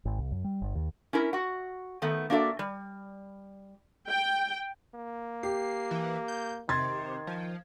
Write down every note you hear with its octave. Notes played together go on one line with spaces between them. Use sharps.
G#1
C2
F#2
G3
G1
D#2
C#4 E4 A#4
F#4 F#5
D#3 A3 B3
A#3 D4 F#4 A4 E5
G3
G5
A#3
G4 C7
E3
G6
C3 D#3 C6 G#6 A6
F3